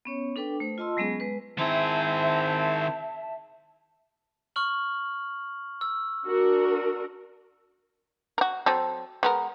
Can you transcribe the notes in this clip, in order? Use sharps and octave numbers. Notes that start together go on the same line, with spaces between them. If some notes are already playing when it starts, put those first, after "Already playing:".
B3 C#4 C#5
D4 A4 B4 G5 D6
A3 C5
F4 D#5 A5 C6 E6
F#3 G#3 B3 C#4 G#4
G#3 B4
D#3 C4 E4 G#4 C5 E5 A5
C#6 F6 F#7
E6
D4 F#4 A#4
F#4 A#4
F#3 C4 A4
G#3 B3 A#4